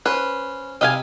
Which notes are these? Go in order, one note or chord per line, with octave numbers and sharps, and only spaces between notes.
C#4 B4 C5
C3 D#5 F5 G#5 B5